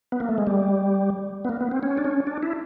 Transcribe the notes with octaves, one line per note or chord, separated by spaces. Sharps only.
B3
A#3
A3
G#3
G3
B3
A#3
B3
C4
C#4
D4
C#4
D4
E4